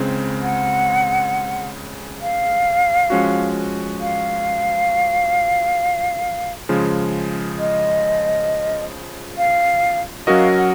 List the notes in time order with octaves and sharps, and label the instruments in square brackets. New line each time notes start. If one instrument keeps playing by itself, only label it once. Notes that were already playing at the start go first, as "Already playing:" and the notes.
Already playing: [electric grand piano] C#2 C#3 G#3 C4
[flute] F#5
F5
[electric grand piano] F3 G#3 C#4 F#4
[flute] F5
[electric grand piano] C#3 F3 G#3
[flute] D#5
F5
[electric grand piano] F#3 C#4 F#4 A#4 D#5 [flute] F5
[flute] F#5